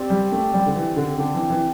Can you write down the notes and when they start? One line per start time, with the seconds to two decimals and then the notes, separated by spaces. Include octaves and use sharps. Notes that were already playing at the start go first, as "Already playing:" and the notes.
Already playing: C4 G4 D5
0.10 G3
0.32 A3
0.54 G3 C4 G4 D5
0.66 D3
0.76 E3
0.96 D3
1.18 D3 D4 G4 C5
1.34 E3
1.50 E3